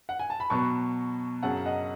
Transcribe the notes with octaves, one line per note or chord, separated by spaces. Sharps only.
F#5
G#5
A5
B5
B2 F#3 B3 A5 C#6
F#2 C#3 F#3 C#4 F#5 A5
D#5 F#5